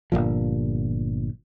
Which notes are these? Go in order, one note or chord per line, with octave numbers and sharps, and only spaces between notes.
G1 C2 A#2 F3